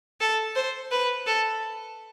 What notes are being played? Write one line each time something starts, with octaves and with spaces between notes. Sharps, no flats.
A4
C5
B4
A4